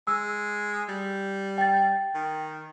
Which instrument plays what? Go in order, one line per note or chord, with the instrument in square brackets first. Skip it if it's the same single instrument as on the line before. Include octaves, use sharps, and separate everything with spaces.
[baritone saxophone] G#3 [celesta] E6
[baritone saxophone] G3
[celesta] G5 A6
[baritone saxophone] D#3